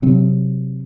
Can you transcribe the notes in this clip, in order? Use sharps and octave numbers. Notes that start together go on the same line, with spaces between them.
C3 F#3 C4